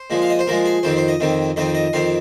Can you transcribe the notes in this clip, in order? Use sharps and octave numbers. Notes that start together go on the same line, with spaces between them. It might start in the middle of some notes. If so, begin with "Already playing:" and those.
Already playing: C5
A#2 F3 G#3
F5
D#5
C5
A#2 F3 G#3 A#4
G#4
F2 D#3 C4 C5
C5
D#5
F2 D#3 C4
F2 D#3 C4 D#5
D#5
F2 D#3 C4 F5